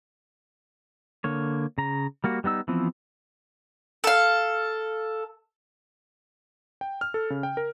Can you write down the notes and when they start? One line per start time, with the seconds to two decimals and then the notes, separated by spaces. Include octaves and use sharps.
1.24 D3 A#3 C#5
1.78 C#3 A#5
2.24 G3 A#3 F#4
2.44 G3 B3 D#4 E6
2.68 E3 F3 B3 C4
4.04 A4 F5
6.81 G5
7.01 F6
7.14 A4
7.30 C#3
7.43 G5
7.57 A#4